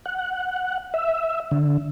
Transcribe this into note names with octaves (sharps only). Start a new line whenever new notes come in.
F#5
E5
D3